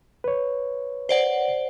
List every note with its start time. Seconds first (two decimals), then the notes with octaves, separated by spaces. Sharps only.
0.24 B4 C#5
1.09 C5 D5 F#5